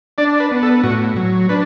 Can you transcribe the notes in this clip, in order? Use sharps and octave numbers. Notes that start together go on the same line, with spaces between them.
D4 D5
B4
B3
A4
A2 F#4
F#3
D4 B4